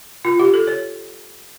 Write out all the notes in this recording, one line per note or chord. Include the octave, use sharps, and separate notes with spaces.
F4
G4
A4
C#5